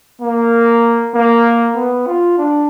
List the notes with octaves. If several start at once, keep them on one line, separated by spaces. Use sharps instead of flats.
A#3
A#3
B3
F4
D4